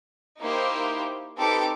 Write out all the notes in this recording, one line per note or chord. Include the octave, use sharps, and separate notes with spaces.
A#3 D#4 E4 G4 C5
C4 D#4 G4 A4 B4 D6